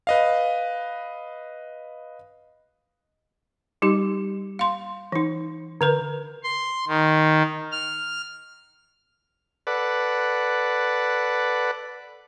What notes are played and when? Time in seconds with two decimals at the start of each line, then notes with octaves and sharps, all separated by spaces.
0.07 B4 D#5 F5
3.82 G3 D#4 G4
4.59 F5 C6
5.12 E3 D#4
5.81 D3 A#4 B4
6.43 C6
6.88 D#3
7.72 F6
9.67 A4 B4 D5 F#5